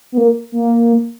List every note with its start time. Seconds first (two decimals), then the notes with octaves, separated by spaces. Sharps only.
0.12 B3
0.18 A#3
0.52 A#3